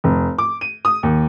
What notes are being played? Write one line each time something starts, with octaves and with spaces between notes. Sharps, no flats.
F1
D6
D#7
D#6
D#2